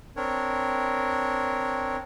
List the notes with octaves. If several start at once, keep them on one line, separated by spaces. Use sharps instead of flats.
C4 D4 A#4 C#5